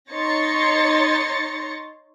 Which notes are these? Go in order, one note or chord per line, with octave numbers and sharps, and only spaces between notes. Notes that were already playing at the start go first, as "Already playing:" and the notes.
D#4 C#5 C6 A6 A#6 C#7